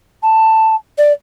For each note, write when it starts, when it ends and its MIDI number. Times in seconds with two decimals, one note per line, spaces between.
0.23 0.76 81
0.98 1.12 74